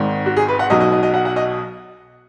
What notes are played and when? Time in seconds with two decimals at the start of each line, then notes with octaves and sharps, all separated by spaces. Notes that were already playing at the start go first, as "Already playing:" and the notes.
Already playing: G#1 G#2 D#3
0.26 F#4
0.37 G#4
0.48 B4
0.59 F#5
0.70 B1 B2 F#3 D#5
0.80 D#5
0.92 D#5
1.03 D#5
1.14 F#5
1.25 F#5
1.36 D#5